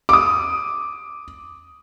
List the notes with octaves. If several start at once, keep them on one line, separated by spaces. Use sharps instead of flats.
D6 D#6